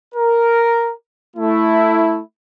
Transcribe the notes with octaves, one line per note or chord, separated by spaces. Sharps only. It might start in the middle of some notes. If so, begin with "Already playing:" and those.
A#4
A3 E4